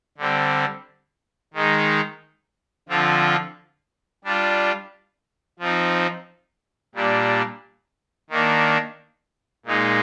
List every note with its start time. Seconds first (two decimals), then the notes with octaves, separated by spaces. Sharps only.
0.18 D3 G3 C4
1.54 D#3 G#3 D#4
2.89 D3 F3 C4 F4
4.24 G3 D4 F4
5.59 F3 C4 D#4
6.95 A#2 G3 D4
8.30 D#3 A#3 D4
9.66 A#2 G#3 D#4